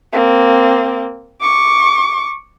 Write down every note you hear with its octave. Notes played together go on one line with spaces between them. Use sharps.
A#3 C4
C#6 D6